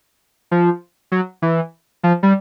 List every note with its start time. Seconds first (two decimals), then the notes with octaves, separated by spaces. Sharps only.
0.51 F3
1.12 F#3
1.42 E3
2.03 F3
2.23 G3